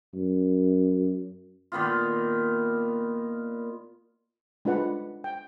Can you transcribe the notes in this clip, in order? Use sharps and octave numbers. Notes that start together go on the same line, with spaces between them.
F#2
A#2 D#3 B3 F4
G#3 D4 F4 B4 F#5
G5